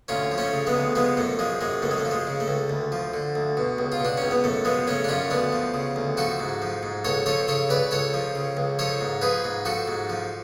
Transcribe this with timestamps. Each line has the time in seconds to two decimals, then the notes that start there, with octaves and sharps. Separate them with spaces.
0.08 D2 C#4 F4
0.31 F3
0.38 A3 C#4
0.53 C#3
0.67 G#3 B3
0.74 D2
0.95 F3 G#3 B3
1.17 F#2 A3
1.39 F3 G#3
1.61 F#2 G#3
1.82 C#2 A3
1.91 G#3
1.98 A3
2.05 F3
2.11 G#3
2.27 C#3
2.40 A3
2.48 C#2
2.70 D2
2.92 F3
3.14 D3
3.35 D2
3.57 B2
3.78 C#2
3.92 F4
4.00 B2 D4
4.17 C#2 C#4
4.31 B3
4.44 F#2 A3
4.65 F3 G#3 B3
4.87 C#3 A3 C#4
5.04 D4
5.08 F#2 C#4 F4
5.30 D2 B3 D4
5.52 F3
5.74 C#3
5.96 D2
6.17 F3 F#4 A4
6.40 G#2
6.62 F3
6.83 G#2
7.05 C#2 A4 C#5
7.26 F3 A4 C#5
7.48 C#3 A4 C#5
7.69 C#2 B4 D5
7.91 C#2 A4 C#5
8.14 F3
8.35 C#3
8.57 C#2
8.79 F3 A4 C#5
9.01 G#2
9.21 F3 G#4 B4
9.44 G#2
9.65 F3 F#4 A4
9.88 G#2
10.10 F3